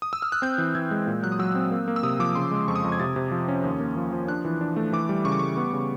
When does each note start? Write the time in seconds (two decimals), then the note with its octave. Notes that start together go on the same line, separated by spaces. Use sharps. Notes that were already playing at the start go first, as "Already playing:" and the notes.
0.02 D#6
0.13 E6
0.22 F6
0.32 F#6
0.42 C4 G6
0.58 E3
0.75 E3 G#6
0.91 G#3
1.07 A#2
1.23 F#3 F#6
1.32 D#6
1.39 F#3 E6
1.55 C4
1.71 A#3
1.88 A#3
1.96 E6
2.03 C3 D#6
2.19 F3 D6
2.35 C#3 C6
2.51 G#3
2.68 F2 C#6
2.76 D#6
2.84 F2
2.92 G#6
3.00 C3 A6
3.16 C3
3.32 F3
3.48 C#4
3.64 D#2
3.80 A#3
3.97 F3
4.12 F3
4.28 D4 F#6
4.45 E3
4.61 D4
4.76 A3
4.93 E3 D6
5.09 G3
5.25 C#3 C#6
5.32 D6
5.39 G3 C#6
5.57 B3
5.73 C#3